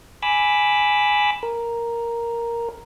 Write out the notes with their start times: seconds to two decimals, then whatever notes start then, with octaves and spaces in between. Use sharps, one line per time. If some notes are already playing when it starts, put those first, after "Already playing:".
0.23 G#5 B5 D6 E6
1.43 A#4